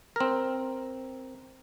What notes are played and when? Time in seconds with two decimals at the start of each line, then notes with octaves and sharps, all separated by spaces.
0.16 C4 A#4